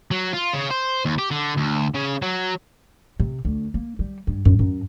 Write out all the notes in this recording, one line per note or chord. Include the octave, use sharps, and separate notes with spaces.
F#3
F4
C#3
C5
D#2
G4
D3
D2
C#3
F#3
C3
D2
A#3
G3
G2
F#2
F#2